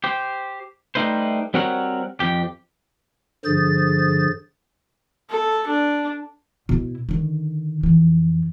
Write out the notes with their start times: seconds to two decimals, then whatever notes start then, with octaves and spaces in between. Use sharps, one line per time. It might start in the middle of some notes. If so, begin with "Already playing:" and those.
0.04 G4 C5
0.95 G3 A3 D#4 B4 C5
1.54 G3 C4 F#4 A#4 C#5 F#5
2.20 F2 G4
3.45 G2 D3 F3 G#4 C5 A6
5.30 A4
5.67 D4
6.69 B2 E4
7.09 D3 D#3
7.83 F2 E3